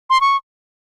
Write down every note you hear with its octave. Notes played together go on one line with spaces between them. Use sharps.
C6
C#6